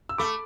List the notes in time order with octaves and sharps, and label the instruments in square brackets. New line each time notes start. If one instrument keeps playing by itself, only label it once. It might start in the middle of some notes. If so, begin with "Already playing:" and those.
[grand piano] E6
[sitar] A3 [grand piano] B5 D6